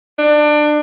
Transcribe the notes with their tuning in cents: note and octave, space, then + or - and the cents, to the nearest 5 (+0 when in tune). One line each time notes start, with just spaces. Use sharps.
D4 +25